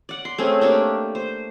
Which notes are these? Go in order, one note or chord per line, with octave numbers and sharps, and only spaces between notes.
D5 F#5
C6
A3 C4 C#4 G#4
A3 A#3 D4 G4
C5